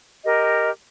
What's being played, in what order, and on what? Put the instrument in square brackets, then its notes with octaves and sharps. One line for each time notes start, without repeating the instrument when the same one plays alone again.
[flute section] G4 A#4 D#5